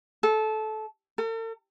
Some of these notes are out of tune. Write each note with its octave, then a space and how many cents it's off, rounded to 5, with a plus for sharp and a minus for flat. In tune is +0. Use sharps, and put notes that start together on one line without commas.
A4 -20
A4 +45